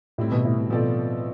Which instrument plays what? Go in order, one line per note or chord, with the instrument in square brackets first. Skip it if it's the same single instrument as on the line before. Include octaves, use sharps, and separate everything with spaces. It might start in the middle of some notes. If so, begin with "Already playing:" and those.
[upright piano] A2 [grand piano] G3 C4 E4
[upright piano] B2
A2
B2
[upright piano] B2 [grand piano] F3 C4 F4 A4 D5